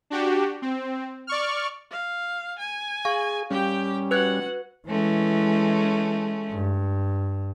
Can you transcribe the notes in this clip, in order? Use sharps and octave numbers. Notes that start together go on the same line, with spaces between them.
D4 F#4 G4
C4
D5 C#6 F6
F5
G#5
G#4 F5 C#6
G3 C#4 G4 G5
F#4 B4 F#5 F#6 G#6
E3 G#3 A3 C#4
G2